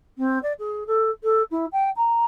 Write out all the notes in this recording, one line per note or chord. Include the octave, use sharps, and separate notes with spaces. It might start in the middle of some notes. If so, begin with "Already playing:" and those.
C4
D5
G#4
A4
A4
E4
G5
A#5